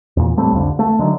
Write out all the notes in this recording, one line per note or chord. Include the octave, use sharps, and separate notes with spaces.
E2 A#2
A2 G3 A3 C4
C2 F2 D3
A3
D3 D#3 F#3